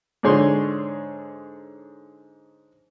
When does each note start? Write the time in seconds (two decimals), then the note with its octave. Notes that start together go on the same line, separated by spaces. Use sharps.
0.23 G#2 D3 G#4 C#5 C6